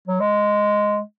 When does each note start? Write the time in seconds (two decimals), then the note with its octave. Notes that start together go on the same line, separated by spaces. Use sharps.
0.08 F#3
0.20 G#3